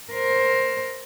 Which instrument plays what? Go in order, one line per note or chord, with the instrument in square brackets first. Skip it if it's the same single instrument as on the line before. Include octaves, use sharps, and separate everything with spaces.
[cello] A#4 C5